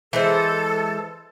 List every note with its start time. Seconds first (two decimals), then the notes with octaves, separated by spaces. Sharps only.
0.13 E3 G#3 A4 C5